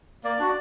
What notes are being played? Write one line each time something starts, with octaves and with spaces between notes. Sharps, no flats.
A#3 D5
D4 F#4